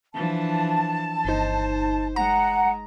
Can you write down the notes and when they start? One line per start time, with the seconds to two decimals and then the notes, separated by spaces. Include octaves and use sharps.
0.15 E3 F3 D4 A5
1.25 G1 D#4 C5
2.16 G#3 F#5 A#5